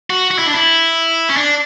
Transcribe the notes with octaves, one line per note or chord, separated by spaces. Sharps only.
F#4
F#4
E4
D4
E4
C#4
D4